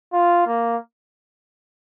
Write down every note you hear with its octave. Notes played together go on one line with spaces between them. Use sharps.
F4
A#3